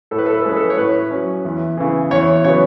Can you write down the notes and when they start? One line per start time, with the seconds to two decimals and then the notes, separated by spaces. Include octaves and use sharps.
0.11 A2 A4
0.18 B4
0.26 A4
0.34 B4
0.41 A4
0.45 G#3 C#4 B4
0.56 A4
0.70 C#5
0.77 A2 B4
1.11 F#3 C#4
1.45 E2
1.77 C#3 E3
2.11 E2 C#5
2.44 C#3 F#3 B3 C#5